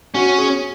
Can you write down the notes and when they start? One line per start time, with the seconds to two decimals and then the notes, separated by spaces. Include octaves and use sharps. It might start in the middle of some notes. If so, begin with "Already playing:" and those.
0.14 C#4 F#4
0.38 G#4